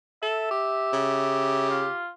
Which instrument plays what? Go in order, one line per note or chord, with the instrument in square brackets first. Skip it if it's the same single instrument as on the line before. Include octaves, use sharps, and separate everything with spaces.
[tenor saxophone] A4 [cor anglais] E5
[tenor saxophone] G4
[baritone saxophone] C#3
[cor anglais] F4